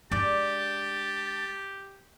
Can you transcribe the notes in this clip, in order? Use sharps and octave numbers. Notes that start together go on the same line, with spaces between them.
G#3 D4 G4 D5 A5